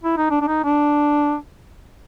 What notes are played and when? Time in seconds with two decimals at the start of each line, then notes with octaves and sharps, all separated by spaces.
0.04 E4
0.17 D#4
0.31 D4
0.41 D4
0.48 D#4
0.64 D4